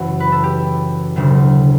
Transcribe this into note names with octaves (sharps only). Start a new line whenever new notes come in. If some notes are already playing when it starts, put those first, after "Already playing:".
Already playing: F#1 F#2 E3 F#4
B4
A4
G4
E1 D2 C#3 F#3